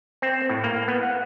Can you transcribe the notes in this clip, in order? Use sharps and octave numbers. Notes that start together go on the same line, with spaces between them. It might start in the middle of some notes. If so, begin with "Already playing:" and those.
C4
A2
A#3
B3
F#5